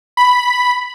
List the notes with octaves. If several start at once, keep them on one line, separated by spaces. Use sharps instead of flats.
B5